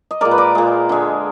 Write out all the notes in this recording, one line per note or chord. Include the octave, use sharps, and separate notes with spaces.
D#5
A#2 G#3 A#4 D5
B4
A#4 D5
A#2 G#3
D3 G#3